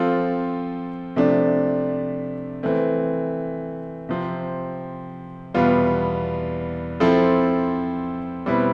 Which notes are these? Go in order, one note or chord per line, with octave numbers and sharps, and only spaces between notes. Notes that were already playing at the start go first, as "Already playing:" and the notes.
Already playing: F3 C4 F4 A4
C3 F3 A3 D4
E3 A3 C4
C3 F3 C4
E2 B2 G3 B3 F4
F3 C4 E4 A4
B2 G3 C4 E4 B4